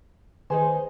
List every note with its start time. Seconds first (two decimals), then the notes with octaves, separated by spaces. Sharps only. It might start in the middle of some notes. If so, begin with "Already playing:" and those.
0.50 D#3 D#4 G#4 B4 C5 G#5